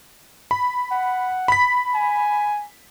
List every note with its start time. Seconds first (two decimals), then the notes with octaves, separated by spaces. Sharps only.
0.51 B5
0.91 F#5
1.48 B5 B6
1.94 G#5